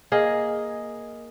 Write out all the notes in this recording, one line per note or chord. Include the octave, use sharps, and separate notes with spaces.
A#3 G#4 D#5